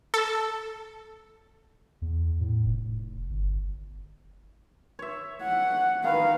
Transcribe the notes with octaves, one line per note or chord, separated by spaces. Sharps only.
A4
E2
A2
F1
G1
C#5 E5
F#5
D#3 B4 F5